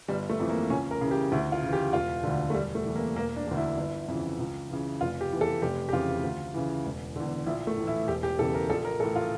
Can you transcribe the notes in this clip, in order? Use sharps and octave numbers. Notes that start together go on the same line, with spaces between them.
G1 G3
A3
F2 E3
A#3
C#2 C#4
A#4
C#3 E3
G4
D2 E4
F4
C#3 E3
G4
E1 F4
D2 D3
A3
E1 G3
A3
E2 E3
A#3
E1 A#3
D4
D2 D3
E4
G1
F2 C#3 E3
C#2
C#3 E3
F1 F4
G4
E2 E3
A4
F1 G4
G4
F2 C#3 E3 F4
D2
C#3 E3
E1
E2 D3
A#1 E4
A3
A2 E3
E4
E1 G4
G4
E2 C#3 E3 A4
A#4
A#1 A4
A#4
A2 E3 A4
F4